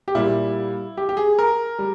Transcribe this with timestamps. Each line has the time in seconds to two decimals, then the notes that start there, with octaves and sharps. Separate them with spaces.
0.08 G4
0.15 A#2 G3 E4
0.97 G4
1.09 G4
1.17 G#4
1.39 A#4
1.79 G3